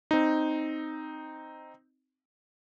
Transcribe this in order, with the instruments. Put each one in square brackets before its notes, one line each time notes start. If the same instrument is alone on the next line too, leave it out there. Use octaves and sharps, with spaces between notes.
[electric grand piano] C4 D#4